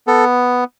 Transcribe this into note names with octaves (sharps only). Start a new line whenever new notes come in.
B3 A4